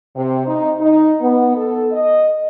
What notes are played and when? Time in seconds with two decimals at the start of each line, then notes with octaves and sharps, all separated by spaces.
0.16 C3
0.47 D#4
0.79 D#4
1.21 B3
1.56 A4
1.92 D#5